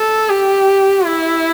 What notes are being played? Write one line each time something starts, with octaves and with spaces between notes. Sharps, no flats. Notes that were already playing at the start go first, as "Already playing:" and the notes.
Already playing: A4
G4
E4